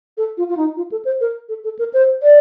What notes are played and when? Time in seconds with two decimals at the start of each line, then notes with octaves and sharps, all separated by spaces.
0.17 A4
0.37 F4
0.49 F4
0.57 D#4
0.77 F4
0.92 A4
1.05 C5
1.21 A#4
1.49 A4
1.64 A4
1.79 A#4
1.93 C5
2.23 D5